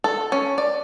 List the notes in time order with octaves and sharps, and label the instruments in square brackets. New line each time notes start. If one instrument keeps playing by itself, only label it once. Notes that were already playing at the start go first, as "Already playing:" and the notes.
[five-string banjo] A4
C#4
D5